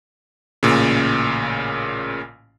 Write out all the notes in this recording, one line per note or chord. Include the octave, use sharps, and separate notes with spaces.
A1 A#2 C#3